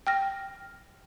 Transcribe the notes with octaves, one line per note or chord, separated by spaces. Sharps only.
G5 F6 A#6